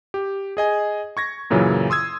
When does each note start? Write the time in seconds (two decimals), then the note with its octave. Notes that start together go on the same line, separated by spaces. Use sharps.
0.14 G4
0.57 G#4 D#5 G#5
1.17 C#6 G#6 A#6
1.50 F#2 A#2 C#3 E3 F#3
1.90 C6 D#6 E6 G#6